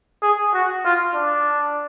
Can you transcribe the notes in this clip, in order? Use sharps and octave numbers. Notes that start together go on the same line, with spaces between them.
G#4
F#4
F4
D4